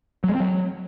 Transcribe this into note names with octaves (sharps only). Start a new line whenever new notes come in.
F#3
G#3
C4
F#3